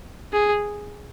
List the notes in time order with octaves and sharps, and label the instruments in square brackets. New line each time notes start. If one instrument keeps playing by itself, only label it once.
[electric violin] G#4